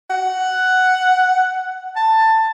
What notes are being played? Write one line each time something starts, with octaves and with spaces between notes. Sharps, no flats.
F#5
A5